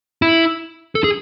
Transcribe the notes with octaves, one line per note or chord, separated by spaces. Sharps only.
E4
A4
G#4